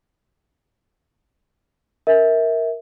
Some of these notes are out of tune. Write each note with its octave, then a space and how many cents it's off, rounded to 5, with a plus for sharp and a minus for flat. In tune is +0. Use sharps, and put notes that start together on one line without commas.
A#4 +0 E5 -25